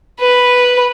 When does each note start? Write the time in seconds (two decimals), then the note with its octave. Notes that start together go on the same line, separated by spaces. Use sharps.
0.20 B4